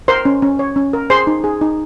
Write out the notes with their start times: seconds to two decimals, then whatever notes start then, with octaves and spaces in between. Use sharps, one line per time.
0.08 A#4 C5 C6
0.25 C#4
0.42 C#4
0.59 C#5
0.76 C#4
0.93 A#4
1.10 G#4 C5 C6
1.27 D#4
1.44 G#4
1.61 D#4